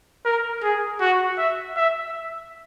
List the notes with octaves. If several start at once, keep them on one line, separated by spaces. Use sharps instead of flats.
A#4
G#4
F#4
E5
E5